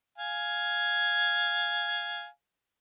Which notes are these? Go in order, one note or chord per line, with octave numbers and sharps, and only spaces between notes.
F5 G#5